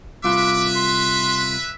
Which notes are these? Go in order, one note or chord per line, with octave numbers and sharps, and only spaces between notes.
C2 F4 B4 E5 D6
C6